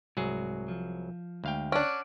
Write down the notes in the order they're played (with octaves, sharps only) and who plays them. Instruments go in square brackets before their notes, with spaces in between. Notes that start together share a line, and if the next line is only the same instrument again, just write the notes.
[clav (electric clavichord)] C2 F#3 G#4 [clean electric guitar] G#2
[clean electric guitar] F3
[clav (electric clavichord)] D2 F5 G5 [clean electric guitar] G#3
[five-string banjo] C#4 D4 [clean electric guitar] D5 F#5